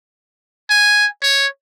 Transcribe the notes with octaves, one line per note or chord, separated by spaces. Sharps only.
G#5
C#5